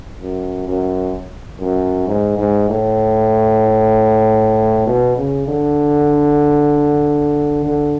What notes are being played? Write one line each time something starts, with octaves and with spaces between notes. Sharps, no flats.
F#2
F#2
F#2
G#2
G#2
A2
B2
C#3
D3
D3